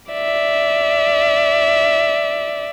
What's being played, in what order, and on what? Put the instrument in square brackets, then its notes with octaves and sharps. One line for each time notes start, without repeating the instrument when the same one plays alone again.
[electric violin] D5 E5